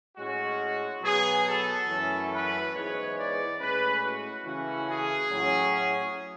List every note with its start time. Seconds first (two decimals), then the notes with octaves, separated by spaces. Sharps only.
0.17 A2 G#3 C#4 F#4
1.03 B2 F#3 B3 G#4
1.46 A4
1.88 F#2 E3 A3 C#4
2.32 B4
2.73 G#2 E3 G#3 B3 C#5
3.16 D5
3.59 A2 G#3 C#4 B4
4.03 F#4
4.45 C#3 E3 A3 C#4 F#4
4.89 G#4
5.31 A2 F#3 C#4